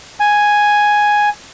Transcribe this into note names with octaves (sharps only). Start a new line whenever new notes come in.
G#5